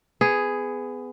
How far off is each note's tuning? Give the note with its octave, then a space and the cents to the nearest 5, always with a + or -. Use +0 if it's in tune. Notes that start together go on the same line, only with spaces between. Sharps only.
B3 +25 G#4 +0